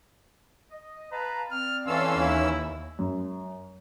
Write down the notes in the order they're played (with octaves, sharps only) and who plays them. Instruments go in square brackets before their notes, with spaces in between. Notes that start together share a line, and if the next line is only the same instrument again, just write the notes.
[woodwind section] D#5
[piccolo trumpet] B4 [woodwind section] F5 A5 A#5
[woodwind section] C4 D5 [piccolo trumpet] F6
[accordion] E3 C#4 E6 [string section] A4 F5 [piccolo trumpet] C6
[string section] D#2 [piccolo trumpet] E4
[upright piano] F#2